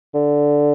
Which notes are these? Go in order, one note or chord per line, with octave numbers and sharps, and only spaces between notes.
D3